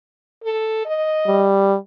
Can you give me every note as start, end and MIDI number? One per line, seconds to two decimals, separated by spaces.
0.44 0.82 69
0.86 1.48 75
1.27 1.76 55